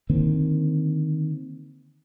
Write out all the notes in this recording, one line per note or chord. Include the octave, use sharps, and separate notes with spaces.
D3 D#3 A#3 C4